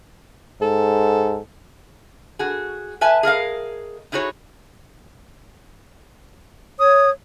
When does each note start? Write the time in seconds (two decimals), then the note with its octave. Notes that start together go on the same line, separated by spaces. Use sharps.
0.62 G#2 A4
2.39 F#4 G#4
3.01 B4 E5 G#5 A5
3.23 G#4 A#4 D#5 F5
4.12 D#4 E4 F#4 G#4 C#5
6.80 C#5 D#6